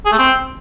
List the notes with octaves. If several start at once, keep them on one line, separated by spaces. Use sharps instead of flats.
G#4
A3
C4